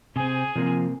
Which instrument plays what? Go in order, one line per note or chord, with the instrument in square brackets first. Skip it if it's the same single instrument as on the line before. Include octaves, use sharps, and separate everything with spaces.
[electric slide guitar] C3 C4 [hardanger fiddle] G#4 G#5
[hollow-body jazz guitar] C3 A#3 [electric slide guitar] F3